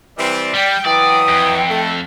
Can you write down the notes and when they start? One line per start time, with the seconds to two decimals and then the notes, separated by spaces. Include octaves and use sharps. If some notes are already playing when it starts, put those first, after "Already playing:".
0.18 E3 G3 C4 D5
0.54 G3 G5
0.85 E3 F#3 D5 G5 D#6
1.29 F2
1.69 A3 A4